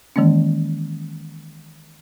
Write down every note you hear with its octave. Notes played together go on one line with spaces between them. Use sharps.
D#3 E3 G#3 A#3 C#4